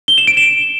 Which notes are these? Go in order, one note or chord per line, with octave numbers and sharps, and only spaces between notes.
G7
E7
D7
E7